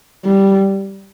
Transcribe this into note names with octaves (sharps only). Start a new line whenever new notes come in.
G3